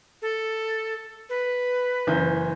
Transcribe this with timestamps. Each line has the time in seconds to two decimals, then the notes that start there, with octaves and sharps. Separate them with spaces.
0.22 A4
1.29 B4
2.07 F#1 E3 G6